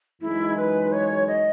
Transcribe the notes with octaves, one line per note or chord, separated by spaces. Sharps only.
F#2 E3 G#3 D#4 E4 G#4
B4
C#5
D#5